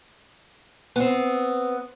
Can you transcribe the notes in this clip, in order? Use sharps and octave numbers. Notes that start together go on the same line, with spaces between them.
B3 C4